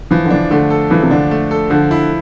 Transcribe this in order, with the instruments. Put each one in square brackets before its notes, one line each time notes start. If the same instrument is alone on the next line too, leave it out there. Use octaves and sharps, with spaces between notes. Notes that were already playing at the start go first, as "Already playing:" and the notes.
[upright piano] E3 [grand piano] F3
[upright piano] D3
[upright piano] E3 [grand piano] D4
[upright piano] D3 [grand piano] A3
[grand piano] A4
[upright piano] E3 [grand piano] F3
[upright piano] C3
[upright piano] D3 [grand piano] D4
[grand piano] A3
A4
[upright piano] D3 [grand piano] F3
[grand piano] E4